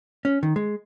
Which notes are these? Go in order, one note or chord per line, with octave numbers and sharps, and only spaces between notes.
C#4
D#3
G#3